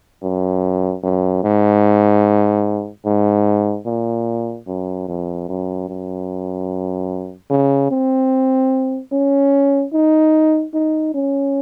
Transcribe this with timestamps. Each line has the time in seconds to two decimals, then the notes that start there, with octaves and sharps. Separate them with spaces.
0.23 F#2
1.03 F#2
1.43 G#2
3.05 G#2
3.86 A#2
4.67 F#2
5.08 F2
5.49 F#2
5.89 F#2
7.50 C#3
7.91 C4
9.12 C#4
9.93 D#4
10.74 D#4
11.14 C#4